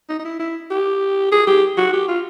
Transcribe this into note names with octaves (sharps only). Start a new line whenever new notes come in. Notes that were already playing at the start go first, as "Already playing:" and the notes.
D#4
D#4
E4
E4
G4
G#4
G4
F#4
G4
F4